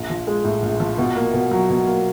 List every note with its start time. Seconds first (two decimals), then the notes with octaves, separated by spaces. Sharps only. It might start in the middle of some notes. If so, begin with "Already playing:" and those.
Already playing: A#1
0.10 F3
0.27 G#3
0.44 A2
0.62 A#1
0.80 F3
0.98 B2
1.16 A#3
1.34 B2
1.51 F#3
1.70 B2
1.87 A#3